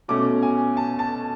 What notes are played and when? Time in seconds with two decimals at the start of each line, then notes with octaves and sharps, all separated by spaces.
0.08 B2 A3 C#4 D6
0.42 G#5
0.77 A5
0.99 A5